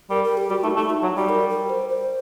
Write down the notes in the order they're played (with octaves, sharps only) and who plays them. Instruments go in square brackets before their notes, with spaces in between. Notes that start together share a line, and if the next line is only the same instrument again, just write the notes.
[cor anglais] G3 [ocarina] A#4
[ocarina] A#4
G4
[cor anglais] G3 [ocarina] F#4
[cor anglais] A3 [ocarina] D#4
[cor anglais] A3 [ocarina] D#4
[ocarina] F#4
[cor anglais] F#3 [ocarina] D#4
[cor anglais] G3 [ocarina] F#4
[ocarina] A#4
A#4
C5
C5